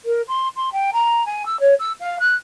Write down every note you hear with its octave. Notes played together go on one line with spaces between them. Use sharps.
A#4
C6
C6
G5
A#5
G#5
E6
C#5
E6
F5
F#6